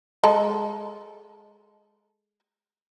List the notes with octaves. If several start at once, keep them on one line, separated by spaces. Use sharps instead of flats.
G#3 A4 A#5